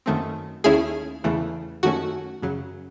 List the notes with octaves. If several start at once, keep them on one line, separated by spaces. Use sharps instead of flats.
F#2 D#3 A3 C4
D#2 D#3 A3 C#4 E4 G#4
E2 C#3 E3 A3
F#2 D#3 A3 C#4 F#4
F#2 C#3 F#3